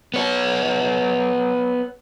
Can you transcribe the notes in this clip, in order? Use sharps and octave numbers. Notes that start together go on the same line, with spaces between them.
B3 C#5